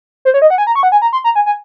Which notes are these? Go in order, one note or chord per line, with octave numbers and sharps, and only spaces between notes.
C5
C#5
D#5
F#5
G#5
A#5
C#6
F#5
G#5
A#5
C6
A#5
G#5
G#5